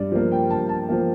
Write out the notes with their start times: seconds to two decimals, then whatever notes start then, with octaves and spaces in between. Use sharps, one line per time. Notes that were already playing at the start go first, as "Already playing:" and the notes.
Already playing: G2 D5
0.12 F3 A#3
0.32 G5
0.50 G2 A5
0.69 A5
0.89 F3 A#3